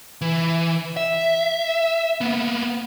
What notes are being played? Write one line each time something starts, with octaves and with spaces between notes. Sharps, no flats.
E3
E5
A#3 B3